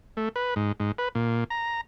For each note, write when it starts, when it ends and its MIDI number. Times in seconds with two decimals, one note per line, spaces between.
0.17 0.29 57
0.36 0.54 71
0.56 0.72 44
0.80 0.92 44
0.98 1.09 71
1.15 1.44 46
1.50 1.81 82